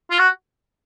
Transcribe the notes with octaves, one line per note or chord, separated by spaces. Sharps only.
F4
F#4